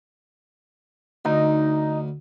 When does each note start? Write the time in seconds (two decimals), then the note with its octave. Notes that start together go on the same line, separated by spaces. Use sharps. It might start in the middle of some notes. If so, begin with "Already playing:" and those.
1.25 D2 D#4